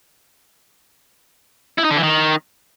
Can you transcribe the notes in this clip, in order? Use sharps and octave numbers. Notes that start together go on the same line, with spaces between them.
E4
D#4
D3
E3
D#3